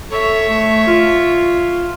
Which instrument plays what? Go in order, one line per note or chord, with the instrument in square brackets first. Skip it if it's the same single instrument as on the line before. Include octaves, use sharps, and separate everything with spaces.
[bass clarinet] A4 [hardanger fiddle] C#5 E5
[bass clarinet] A3
F4